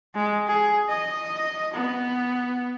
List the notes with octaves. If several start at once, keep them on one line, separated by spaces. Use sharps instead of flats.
G#3
G#4
D#5
B3